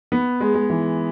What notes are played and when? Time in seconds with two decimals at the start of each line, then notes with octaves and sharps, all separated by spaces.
0.12 B3
0.40 G#3
0.55 G#3
0.70 E3